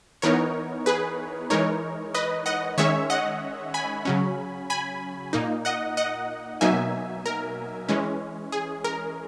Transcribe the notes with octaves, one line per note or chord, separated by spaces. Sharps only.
E3 B3 D#4 A#4 C#5
G#4 B4
E3 G#3 D#4 A#4 C#5
B4 D#5
D#5 F#5
D#3 G#3 C#4 C#5 E5
D#5 F#5
G#5 B5
C#3 F#3 C#4
G#5 B5
A#2 A#3 D#4
D#5 F#5
D#5 F#5
B2 F#3 A#3 D#4 E5 G#5
A#4
E3 G#3 C#4
G#4
A#4